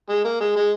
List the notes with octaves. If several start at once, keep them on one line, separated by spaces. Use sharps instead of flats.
G#3
A#3
G#3
G#3